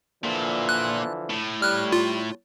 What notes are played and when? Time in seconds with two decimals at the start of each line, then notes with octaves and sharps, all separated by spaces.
0.24 A#2 D3 E3 F3
0.69 F#6
1.30 A2
1.62 G3 F6 F#6
1.93 F4